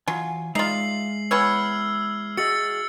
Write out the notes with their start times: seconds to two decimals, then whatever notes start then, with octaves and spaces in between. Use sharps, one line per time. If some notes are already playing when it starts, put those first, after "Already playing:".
0.08 E3 F#3 F4 G#5
0.55 G#3 D#4 F4 D5 E5 C7 F#7
1.31 E3 B3 C#5 E6 F6 G#6
2.37 F#4 G#4 D#5 E6 A6 C#7